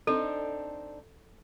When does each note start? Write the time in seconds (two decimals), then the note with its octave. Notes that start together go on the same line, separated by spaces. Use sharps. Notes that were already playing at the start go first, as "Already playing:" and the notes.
0.07 C4 D4 D#4 A4